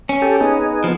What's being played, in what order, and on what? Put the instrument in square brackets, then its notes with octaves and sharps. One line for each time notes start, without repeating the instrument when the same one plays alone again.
[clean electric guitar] C#4
[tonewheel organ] G4 A4
B3 D#4 G#4
[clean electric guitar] F3